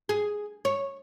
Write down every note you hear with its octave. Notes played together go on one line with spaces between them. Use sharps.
G#4
C#5